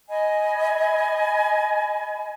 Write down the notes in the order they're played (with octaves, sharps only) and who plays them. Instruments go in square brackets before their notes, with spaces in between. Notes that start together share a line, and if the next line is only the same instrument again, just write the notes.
[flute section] D#5 G#5 B5